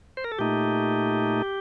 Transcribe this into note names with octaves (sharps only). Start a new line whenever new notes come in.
C5
A#4
A4
A#2 A3 D#4 G4